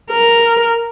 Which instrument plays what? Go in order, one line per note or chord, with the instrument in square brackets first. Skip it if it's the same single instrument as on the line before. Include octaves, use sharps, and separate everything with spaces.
[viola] A#4